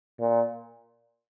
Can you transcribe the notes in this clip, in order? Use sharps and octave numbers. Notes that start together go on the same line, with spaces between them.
A#2